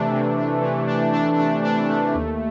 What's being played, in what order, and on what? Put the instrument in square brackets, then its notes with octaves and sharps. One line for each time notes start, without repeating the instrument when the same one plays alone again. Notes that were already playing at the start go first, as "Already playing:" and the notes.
Already playing: [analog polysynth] C3 E3 A3 D4
C3
D4
E3
D4
D4
D4
D4
A3
D#2